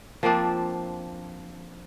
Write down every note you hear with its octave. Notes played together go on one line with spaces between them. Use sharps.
F3 A#3 C4 D4